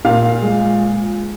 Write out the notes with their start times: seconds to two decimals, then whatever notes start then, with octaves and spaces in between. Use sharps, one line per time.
0.05 A#2 F5
0.42 G#3